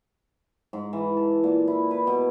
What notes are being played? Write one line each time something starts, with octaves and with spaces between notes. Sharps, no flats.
G#2
E3
A4
A#2
E4
B4
B2